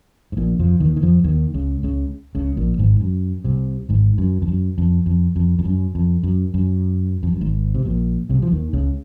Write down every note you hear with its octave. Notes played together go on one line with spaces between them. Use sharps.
G#2
A#1 A#2
F2 F3
D#2 D#3
D#3
F2 F3
D#2 D#3
C#2 C#3
C#2 C#3
C#2 C#3
A#1 A#2
G#1 G#2
F#2
C2 C3
G#1 G#2
F#2
F2
F#2
F2
F2
F2
F2
F#2
F2
F#2
F#2
F2
F#2
G#1 G#2
C3
A#1 A#2
C2 C3
F3
D#2 D#3
C#2 C#3